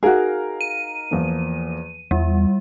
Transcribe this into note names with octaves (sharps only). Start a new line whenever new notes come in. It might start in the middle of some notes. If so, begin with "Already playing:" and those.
D#4 F#4 G#4 A#4 F5
D#7
E2 F3 A#3
E2 G3 E4